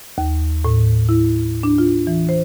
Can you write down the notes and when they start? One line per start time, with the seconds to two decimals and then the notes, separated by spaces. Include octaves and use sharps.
0.18 D#2
0.65 A2
1.09 E4
1.63 D4
1.78 F4
2.07 E3
2.29 C5